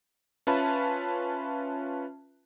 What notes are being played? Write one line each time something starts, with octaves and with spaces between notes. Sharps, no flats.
C#4 F4 B4 E5 A5 B5